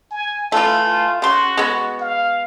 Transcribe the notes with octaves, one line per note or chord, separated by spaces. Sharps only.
G#5
E3 A3 F4
F4
C#3 F#4 C6
G#3 B3
F5